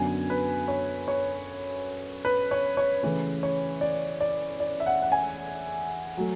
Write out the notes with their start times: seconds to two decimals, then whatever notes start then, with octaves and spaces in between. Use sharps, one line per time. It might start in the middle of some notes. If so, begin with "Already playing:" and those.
Already playing: F#2 D3 F#3 B3 G#5
0.30 B4
0.68 C#5
1.08 C#5
2.25 B4
2.51 C#5
2.77 C#5
3.03 C#3 E3 A3 C#4 B4
3.43 C#5
3.81 D5
4.21 D5
4.60 D5
4.80 E5
4.86 F#5
5.02 F#5
5.12 G#5
6.17 F#3 A3